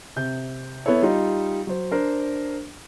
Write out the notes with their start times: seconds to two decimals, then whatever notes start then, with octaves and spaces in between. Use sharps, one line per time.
0.16 C3 G6
0.86 B3 E4 A4 C#5
1.02 G3 D#4 F4
1.67 F#3 C5
1.91 D4 A#4 C5